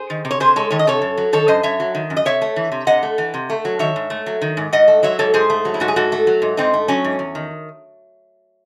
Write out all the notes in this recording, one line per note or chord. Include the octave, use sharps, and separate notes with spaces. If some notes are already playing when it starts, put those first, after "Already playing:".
Already playing: G#4 C5
D#3
C3
C#5
C3 G#4 C5
G#3 A4 C#5
D#3 C#5
D#5
C3 A4 C#5
F#2
F#3
D#3 A4 C#5
F#2 C5 D#5
F#2 C#5 E5
F#3
D#3
F#2
D#5
C3 C#5 E5
A3
E3
C3
C3 D#5 F#5
A3
E3
C3
A3
F#3
D#3 C#5 E5
G#2
A3
F#3
D#3
G#2
G#2 D#5 F#5
A3
F#3 C#5 E5
G#2 A4 C#5
G#2 G#4 C5
A3
F#3
E4
G#2 F#4
G#4
G#2 F#4 A4
A3
F#3
G#2
G#2 C4 D#4
A3
F#3 C#4
G#2
E2
D#3